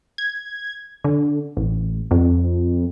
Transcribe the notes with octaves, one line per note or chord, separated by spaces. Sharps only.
G#6
D3
A1
F2